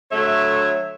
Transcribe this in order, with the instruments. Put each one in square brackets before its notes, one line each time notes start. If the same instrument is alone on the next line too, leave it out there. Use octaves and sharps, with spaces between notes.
[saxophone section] D3 F#3 A3 C#5 E5